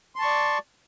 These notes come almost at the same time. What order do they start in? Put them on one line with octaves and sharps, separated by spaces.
C6 A5 C#6 D5